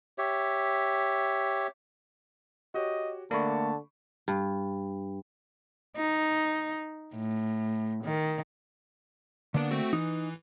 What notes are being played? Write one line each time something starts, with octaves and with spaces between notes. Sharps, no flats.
G4 C#5 E5
F#4 G4 C#5 D#5
D3 A3 A#3 D5 A5 B5 C#6
G2
D#4
A2
D#3
D3 A#3 B3 D4 D5
A3 C4 F#4
E3 D#4